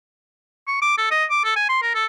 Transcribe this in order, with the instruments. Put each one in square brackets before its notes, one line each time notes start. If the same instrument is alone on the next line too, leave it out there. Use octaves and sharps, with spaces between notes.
[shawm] C#6
D6
A4
D#5
D6
A4
G#5
C6
A#4
A4